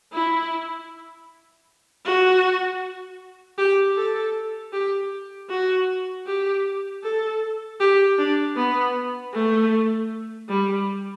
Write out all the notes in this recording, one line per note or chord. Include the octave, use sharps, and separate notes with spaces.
E4
F#4
G4
A4
G4
F#4
G4
A4
G4
D4
B3
A3
G3